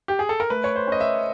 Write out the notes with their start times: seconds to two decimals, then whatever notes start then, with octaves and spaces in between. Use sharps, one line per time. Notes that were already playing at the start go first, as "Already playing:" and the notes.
0.08 G4
0.19 G#4
0.29 A4
0.40 A#4
0.50 A3 B4
0.64 C#5
0.76 C5
0.87 C#4 D#5
1.01 E5